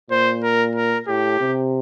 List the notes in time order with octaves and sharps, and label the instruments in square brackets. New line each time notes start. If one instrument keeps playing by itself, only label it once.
[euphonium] A#2 [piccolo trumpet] C5
[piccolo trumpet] A#4
A#4
[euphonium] A2 [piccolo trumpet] G4
[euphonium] C3